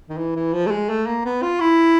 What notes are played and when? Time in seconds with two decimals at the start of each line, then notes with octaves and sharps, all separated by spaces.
0.09 D#3
0.18 E3
0.36 E3
0.53 F3
0.67 A3
0.71 G#3
0.90 A3
1.07 A#3
1.25 B3
1.43 F4
1.60 E4